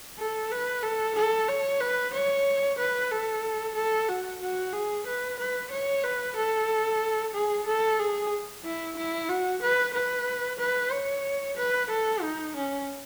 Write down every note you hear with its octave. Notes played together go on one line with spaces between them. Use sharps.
A4
B4
A4
A4
C#5
B4
C#5
B4
A4
A4
F#4
F#4
G#4
B4
B4
C#5
B4
A4
G#4
A4
G#4
E4
E4
F#4
B4
B4
B4
C#5
B4
A4
D#4
C#4